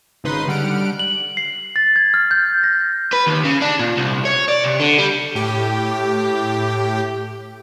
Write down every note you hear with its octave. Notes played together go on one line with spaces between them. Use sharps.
G#1 C#3 D#4 B4 C6 D#6
D3 G3 F#5 F6 D7
F#7
C7
A6
G#6
F6
G6
A#6
B4
D#2
C#3
D4
A#2
C2
C#5
D5
C3
D3
G3
A2 G4